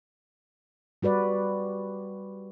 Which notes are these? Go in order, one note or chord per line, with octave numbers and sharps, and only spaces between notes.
G3 F#4 B4 D5